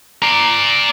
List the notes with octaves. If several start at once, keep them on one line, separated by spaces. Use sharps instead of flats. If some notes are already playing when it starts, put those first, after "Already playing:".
D5 A#5